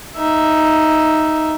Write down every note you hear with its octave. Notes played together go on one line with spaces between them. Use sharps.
D#4 E5